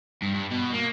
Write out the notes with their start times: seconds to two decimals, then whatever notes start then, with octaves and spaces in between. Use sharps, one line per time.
0.22 G2
0.34 G2
0.51 B2
0.73 A#3